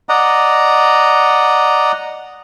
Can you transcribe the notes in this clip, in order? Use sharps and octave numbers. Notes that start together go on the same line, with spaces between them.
D5 D#5 F#5 A#5